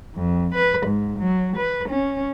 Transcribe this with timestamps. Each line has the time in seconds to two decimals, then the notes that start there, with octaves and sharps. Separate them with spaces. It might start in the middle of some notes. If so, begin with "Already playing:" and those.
0.15 F2
0.55 B4
0.87 G#2
1.19 F#3
1.57 B4
1.90 C#4